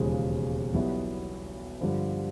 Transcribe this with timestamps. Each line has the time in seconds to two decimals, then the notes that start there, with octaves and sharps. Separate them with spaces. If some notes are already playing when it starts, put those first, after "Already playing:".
Already playing: E1 D#2 C#3 F3 G#3
0.74 B1 B2 G3 B3 E4
1.81 G2 D3 F3